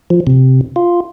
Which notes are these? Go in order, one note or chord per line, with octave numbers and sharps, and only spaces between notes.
F3
C3
F4